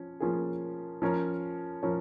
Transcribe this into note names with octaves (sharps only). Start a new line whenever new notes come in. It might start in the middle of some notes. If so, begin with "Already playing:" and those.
Already playing: F3 C#4
F3 A#3 C#4 F4 G#4
F3 C#4 A#4 C#5
F3 C#4 A#4 C#5